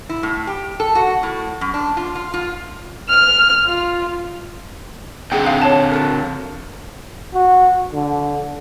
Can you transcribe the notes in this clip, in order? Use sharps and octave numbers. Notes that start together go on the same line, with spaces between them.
E4
A2
G4
A4
F#4
A2
F#2
D4
F4
F4
F4
F6
F4
D3 C4 D#4 G#4 F#5 G5
F5
C#5 A5
F#4 A4 A#4
F#4
D3